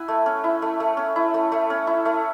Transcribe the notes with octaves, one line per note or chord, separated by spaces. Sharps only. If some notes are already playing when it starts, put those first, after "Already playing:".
Already playing: E4 F#5 G#5
A3
C#4
E4
A3
A3
C#4
E4
A3
A3
C#4
E4
A3